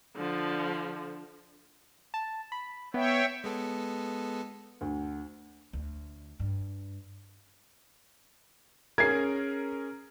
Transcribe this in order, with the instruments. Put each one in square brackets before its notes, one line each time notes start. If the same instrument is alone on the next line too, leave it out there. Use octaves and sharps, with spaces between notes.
[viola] D3 F3
[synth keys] A5
B5
[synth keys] B3 [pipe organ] C#5 E5 G5
[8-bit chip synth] G#3 B3 A4
[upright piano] D2
[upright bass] D2
G2
[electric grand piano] C#4 G#4 A#4 [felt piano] G#6 C7